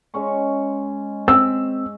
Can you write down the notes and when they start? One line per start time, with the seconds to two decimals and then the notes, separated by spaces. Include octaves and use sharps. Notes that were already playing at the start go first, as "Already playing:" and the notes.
0.14 G#3 C#4 C#6
1.28 C4 E6